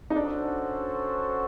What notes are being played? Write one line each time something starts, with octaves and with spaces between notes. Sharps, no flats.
D#4
C#4 D4 F#4 A4 C5